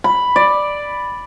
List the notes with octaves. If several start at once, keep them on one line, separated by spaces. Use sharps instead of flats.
B5
D5